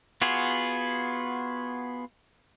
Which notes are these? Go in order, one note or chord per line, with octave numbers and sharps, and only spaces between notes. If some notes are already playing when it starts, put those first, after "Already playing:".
B3 F4 F#4 G#4